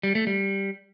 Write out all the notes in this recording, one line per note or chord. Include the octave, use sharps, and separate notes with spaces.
G3
A3
G3